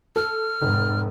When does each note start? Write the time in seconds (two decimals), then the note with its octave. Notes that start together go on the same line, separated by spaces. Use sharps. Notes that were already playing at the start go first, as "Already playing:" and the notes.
0.16 A4 F6
0.62 F1 G#2